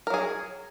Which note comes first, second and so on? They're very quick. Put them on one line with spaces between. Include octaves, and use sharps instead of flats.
A#4 F#3 G#4